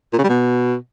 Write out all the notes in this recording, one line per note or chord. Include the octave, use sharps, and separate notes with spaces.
A#2
C#3
G3
B2